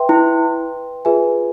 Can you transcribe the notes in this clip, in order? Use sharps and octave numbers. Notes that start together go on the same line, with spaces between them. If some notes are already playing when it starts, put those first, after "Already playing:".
Already playing: B4 E5 G5 C6
E4
F4 G#4 B4 E5 G#5